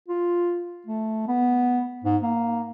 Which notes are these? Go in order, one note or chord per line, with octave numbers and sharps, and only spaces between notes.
F4
A3
B3
G#2
A#3